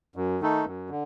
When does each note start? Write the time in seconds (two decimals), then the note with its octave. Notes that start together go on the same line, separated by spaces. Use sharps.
0.16 F#2
0.41 D#3 A3 D#4 A4
0.65 F#2
0.90 D3